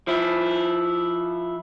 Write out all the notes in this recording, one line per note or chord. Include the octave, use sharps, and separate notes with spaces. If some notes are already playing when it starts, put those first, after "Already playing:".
F3 E4